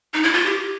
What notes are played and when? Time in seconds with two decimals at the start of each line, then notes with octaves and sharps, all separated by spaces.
0.14 D#4
0.23 E4
0.33 F4
0.45 G4